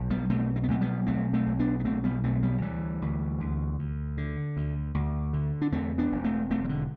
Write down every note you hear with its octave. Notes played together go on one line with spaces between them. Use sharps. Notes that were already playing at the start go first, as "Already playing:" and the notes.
Already playing: B1 B2
G3 B3
B2 A3 C4
C4
B3
B1 A3 C4
G3 B3
B1 A3 C4
A3 C4
B1
B3 D4
B3
B2 A3 C4
G3 B3
B1 A3 C4
G3 B3
D2 E3 G3
D2
D2
D2
D3
D2
D2
D3
D4
E2 A3 C4
B3 D4
E1
A3 C4
E1 A3 C4
E3
D3